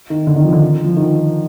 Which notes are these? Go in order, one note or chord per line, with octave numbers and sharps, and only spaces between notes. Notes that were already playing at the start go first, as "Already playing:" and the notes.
D#3
D3
D#3
F3
D3
F3
D#3